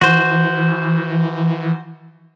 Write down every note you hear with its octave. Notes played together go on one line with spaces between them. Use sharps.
E3 F#4 C5